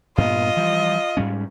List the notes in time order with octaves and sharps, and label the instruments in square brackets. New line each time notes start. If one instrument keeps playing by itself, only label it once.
[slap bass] G2 A#2 B3 [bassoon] F4 [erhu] D#5
[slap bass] E3 F3 G3
G#2 G3 C#4